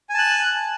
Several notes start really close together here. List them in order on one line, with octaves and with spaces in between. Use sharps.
G#5 A5 F#6